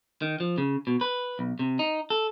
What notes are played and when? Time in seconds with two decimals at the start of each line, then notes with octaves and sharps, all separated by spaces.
0.22 D#3
0.40 F3
0.58 C#3
0.87 B2
1.01 B4
1.39 B1
1.59 C3
1.79 D#4
2.10 A4